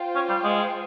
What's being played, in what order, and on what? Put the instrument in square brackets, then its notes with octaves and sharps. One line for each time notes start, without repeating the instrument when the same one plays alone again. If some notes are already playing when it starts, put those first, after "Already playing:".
Already playing: [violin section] F4 C5 G5
[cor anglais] C#4
G3
G#3